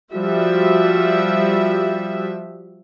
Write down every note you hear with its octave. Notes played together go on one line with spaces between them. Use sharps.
F3 G3 F#4 E5